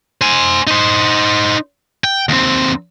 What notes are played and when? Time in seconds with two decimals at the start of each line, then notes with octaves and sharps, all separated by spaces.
0.21 C5 G#5
0.67 D#4 C5
2.04 G5
2.29 D#2 C4